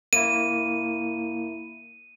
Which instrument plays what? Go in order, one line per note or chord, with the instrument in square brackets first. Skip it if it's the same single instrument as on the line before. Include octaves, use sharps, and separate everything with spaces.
[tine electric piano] A#3 E4 [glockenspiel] D#7